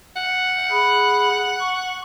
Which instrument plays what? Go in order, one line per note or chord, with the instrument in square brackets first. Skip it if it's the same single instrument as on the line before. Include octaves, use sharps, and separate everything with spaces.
[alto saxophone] F#5
[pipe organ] G#4 B5
C#6